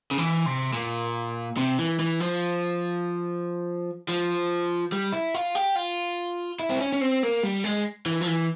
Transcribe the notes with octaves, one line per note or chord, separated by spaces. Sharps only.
C#3
E3
C3
A#2
C3
E3
E3
F3
F3
G3
E4
F4
G4
F4
E4
C4
C#4
C#4
C4
A#3
G3
G#3
E3
F3
E3